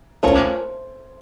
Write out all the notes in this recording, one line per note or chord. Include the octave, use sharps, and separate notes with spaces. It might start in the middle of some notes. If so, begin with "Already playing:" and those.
A3 C#4 F4 A#4 C5 C#5